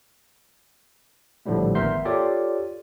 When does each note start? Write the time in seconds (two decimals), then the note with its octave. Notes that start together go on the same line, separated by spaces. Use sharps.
1.46 A#1 A2 D3 F3 G3 A3
1.75 G#1 B3 A#4 E5 C6 G6
2.05 F4 G4 A4 C#5 D5